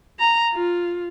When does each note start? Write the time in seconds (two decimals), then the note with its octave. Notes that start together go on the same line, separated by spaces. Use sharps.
0.19 A#5
0.53 F4